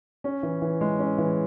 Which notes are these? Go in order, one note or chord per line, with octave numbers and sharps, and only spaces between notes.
C#4
E3
E3
G#3
C#4
E3